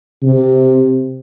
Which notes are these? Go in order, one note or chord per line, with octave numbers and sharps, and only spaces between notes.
C3